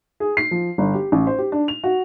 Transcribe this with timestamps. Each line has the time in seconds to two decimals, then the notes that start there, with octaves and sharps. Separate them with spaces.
0.20 G#4
0.37 C7
0.51 F3
0.78 G1
0.94 G4
1.12 A1
1.27 C5
1.38 G4
1.52 D4
1.68 F7
1.84 F#4